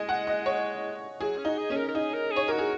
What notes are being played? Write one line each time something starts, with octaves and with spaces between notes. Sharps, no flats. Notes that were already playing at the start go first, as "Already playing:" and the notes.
Already playing: G#3 D#5 G#5
F#5
D#5
C#5
F#3 G#4
C#4
D#4 F#4
G#4
C#4 G#4
A#4
A#4
D#4 G#4
A#4
G#4 C#5
F#4 A#4
G#4